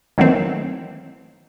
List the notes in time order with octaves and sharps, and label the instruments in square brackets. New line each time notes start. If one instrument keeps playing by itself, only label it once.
[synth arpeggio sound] D#3 E3 F#3 A3 A#3 C4